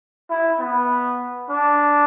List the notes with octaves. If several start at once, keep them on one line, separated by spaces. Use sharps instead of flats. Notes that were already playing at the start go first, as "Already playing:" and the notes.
E4
B3
D4